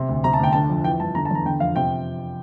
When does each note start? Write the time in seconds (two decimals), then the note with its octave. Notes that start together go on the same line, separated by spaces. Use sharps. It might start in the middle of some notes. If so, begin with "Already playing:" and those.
Already playing: C3
0.09 D2
0.24 C3 A#5
0.33 A5
0.39 D2 G5
0.53 D3 A5
0.69 F2
0.84 E3 G5
1.00 G2 A5
1.15 D3 A#5
1.25 A5
1.31 E2 A#5
1.45 D3 G5
1.60 F2 F5
1.76 C3 G5